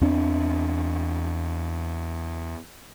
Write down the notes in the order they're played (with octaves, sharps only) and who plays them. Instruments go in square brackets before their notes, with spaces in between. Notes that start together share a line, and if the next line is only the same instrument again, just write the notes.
[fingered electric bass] E2 C4 D4